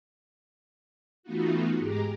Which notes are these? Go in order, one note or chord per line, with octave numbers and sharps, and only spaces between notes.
E3 A3 B3 D#4 F4 F#4
G#2 G#3 G4 G#4 A#5 D6